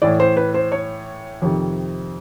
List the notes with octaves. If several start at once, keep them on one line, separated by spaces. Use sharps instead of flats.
A2 E3 D5
C5
B4
C5
C#5
F2 C3 D#3